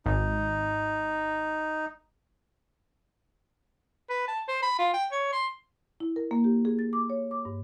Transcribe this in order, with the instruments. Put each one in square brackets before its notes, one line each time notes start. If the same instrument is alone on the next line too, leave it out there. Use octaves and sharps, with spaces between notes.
[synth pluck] G#1 [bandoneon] D#4
[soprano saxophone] B4
A5
C5
B5
F4
G5
C#5
C6
[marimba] E4
A#4
A#3
G4
G#4
A6
D6
C#5
D6
G2